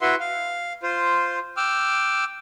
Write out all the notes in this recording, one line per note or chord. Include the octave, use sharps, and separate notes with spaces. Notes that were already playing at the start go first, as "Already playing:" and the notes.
E4 F#4 B4 E5 F#5 C6
F5
F4 C5
G5 D6 E6 F6